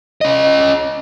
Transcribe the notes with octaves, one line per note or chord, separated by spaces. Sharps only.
C#4 D#5